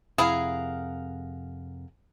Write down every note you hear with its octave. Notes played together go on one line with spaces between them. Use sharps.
F2 C3 E4 G#4 A#4 F5 F#5